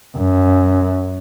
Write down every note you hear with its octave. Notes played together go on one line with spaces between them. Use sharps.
F#2